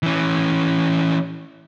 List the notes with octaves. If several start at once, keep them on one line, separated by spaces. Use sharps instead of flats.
E3 C#4